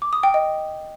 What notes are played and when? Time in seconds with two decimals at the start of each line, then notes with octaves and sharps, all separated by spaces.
0.02 D6
0.13 D#6
0.23 G5
0.34 D#5